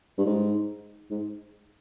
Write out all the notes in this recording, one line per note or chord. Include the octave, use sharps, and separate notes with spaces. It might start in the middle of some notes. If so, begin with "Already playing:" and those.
G2
G#2
G#2